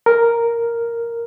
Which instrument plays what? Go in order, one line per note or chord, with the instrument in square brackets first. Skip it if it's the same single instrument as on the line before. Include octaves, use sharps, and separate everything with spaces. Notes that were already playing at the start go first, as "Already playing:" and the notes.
[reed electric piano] A#4